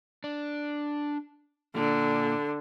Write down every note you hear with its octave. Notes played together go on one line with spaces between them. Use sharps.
D4
A#2 D3